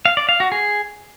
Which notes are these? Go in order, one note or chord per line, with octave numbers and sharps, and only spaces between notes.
F5
D5
F5
F#4
G#4